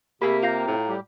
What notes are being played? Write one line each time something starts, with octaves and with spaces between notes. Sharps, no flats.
C3 A3 A#3 G4 G#4 B5
F4 F5 G5 A#5 C7
A2
G3 G4